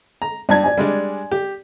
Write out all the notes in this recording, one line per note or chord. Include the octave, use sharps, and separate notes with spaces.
A#5
G2 D5 A5 G#6
D5 G#5
G3 G#3 D4
G4